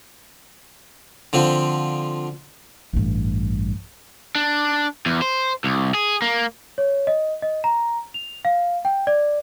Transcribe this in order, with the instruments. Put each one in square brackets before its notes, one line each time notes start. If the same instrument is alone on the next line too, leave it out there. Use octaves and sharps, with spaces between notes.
[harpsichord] D3 F3 C4
[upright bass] A1 G2
[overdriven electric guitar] D4
E2
C5
C2
G#4
A#3
[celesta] C#5
D#5
D#5
A#5
F7
F5
G5
D5